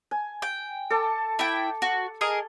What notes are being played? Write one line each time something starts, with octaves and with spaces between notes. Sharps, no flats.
G#5
G5
A4 A5 D6
E4 G5
F#4
G#4 A#4 D#5